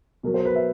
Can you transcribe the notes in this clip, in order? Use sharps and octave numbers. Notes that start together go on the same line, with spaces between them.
B2 F#3 A#4
C5
B4
E5